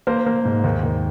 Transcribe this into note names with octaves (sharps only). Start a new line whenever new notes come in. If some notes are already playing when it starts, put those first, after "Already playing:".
A#3 C5
A#3
G#2
D#2
D#2